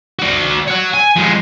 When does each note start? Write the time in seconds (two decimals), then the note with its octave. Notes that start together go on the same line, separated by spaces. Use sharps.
0.19 F#4 D5
0.67 C#5 F#5
0.93 G#5
1.16 F2 G#3